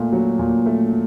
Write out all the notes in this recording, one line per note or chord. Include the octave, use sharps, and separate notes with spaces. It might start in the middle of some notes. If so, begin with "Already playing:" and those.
Already playing: A#2 A3
F#3
A#2
A3